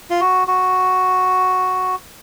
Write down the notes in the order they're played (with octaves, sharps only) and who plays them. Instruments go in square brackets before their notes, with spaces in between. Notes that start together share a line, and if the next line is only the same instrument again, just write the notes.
[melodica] F4
F#4
F#4